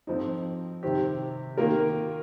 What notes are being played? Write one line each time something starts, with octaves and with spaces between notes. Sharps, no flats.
F2 F3 C4 D#4
C3 D#3 C4 G4
D#3 A#3 F4 A#4